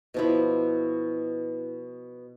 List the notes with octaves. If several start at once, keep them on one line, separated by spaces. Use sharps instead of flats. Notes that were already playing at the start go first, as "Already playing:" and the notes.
B2 F3 E4